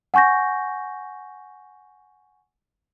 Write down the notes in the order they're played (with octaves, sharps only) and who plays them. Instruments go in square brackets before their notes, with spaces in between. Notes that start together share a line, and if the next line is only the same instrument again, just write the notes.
[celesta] F#5 G#5 C#6 G6 A#6